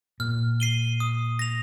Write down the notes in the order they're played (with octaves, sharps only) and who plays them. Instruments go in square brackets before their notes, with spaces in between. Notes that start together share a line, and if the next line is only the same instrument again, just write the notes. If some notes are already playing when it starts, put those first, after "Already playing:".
[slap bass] A#2 [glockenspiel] F6
[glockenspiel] C7 D#7 G7
D#6
A#6 F7